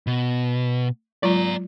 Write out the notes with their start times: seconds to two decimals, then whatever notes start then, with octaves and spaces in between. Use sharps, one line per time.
0.07 B2
1.23 F#3 G#3 F4 D5 A#5